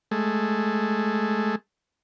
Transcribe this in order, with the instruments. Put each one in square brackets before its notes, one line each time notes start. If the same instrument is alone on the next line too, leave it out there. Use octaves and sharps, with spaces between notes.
[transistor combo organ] G#3 A3